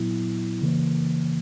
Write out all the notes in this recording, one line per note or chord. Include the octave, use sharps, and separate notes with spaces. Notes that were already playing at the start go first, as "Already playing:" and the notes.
Already playing: A#2 F#3 B3 E4
C#3 E3 A#3